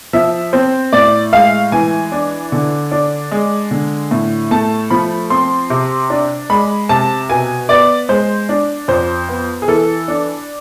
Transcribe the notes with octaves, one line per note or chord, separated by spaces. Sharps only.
F3 E5
C4 C5
A2 D5
G#3 F5
E3 G#5
D4
D3
D4
G#3
D3
A2
A3 A5
F3 B5
C4 C6
C3
D4
G#3 B5
C3 A5
B2 G#5
B3 D5
G#3 C5
D4
F2 C5
B3
G#4
E3 A4
D4